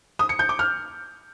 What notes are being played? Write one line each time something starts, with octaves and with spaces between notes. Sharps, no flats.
D#6
C#7
G6
D6
F6